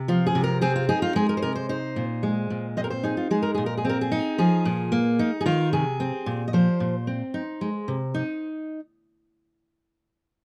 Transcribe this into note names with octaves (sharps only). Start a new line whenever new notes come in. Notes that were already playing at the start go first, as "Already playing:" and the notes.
Already playing: C3
F3 F4
G#4
C3
A#4
C4 G#4
F4
D#4 G#4
F4
G#3 G#4
A#4
C5
C3 A#4
C5
D#4 C5
A#2
G#3
A#2
C4 D#5
A#4
C5
D#4 G#4
F4
G#3 G#4
A#4
A#2 G#4
A#4
G#4
C4 A#4
G#4
D#4
F3 G#4
A#2
A#3
D#4
G#4
D#3 F4
C3 G#4
C4
A#2
D#5
F3 C5
A#2
C4
D#4
G#3
C3
D#4